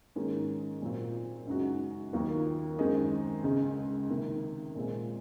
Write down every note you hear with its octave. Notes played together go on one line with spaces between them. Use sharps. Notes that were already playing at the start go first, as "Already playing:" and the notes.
G#2 D#3 A#3 C#4
A#2 F#3 C4 F4
F#2 C#3 G#3 D#4 F#4
D#2 D#3 F#3 A#3 F4
F#2 D#3 G#3 C4 D#4
C#2 C#3 G#3
C3 D#3 A#3
A#2 G#3 C4 F4